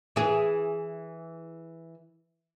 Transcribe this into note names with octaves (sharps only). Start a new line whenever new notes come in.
E3 E4 G#4